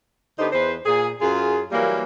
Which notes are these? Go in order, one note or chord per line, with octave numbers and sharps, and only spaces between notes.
D3 B3 D#4 G4 C5
E2 B4 C5
A#2 G#4
F#2 F4 G#4
E3 F#3 G3 A#3